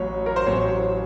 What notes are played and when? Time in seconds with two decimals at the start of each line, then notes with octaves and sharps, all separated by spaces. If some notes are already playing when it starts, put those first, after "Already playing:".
Already playing: A1 A2 F#3 C#5
0.26 A#4
0.36 C5
0.46 A1 A2 F#3 C#5